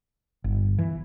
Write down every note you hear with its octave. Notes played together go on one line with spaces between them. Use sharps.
G1
E3